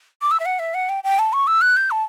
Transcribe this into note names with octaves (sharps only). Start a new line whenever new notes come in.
D6
E6
E5
F#5
E5
F#5
G5
G5
A5
C#6
E6
F#6
G6
A5